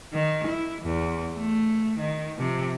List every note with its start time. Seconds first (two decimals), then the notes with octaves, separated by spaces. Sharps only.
0.13 D#3
0.48 E4
0.82 E2
1.37 A3
1.99 D#3
2.38 C3 F3